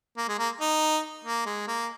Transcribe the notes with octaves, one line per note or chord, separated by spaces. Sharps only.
A#3
G#3
A#3
D#4
A#3
G#3
A#3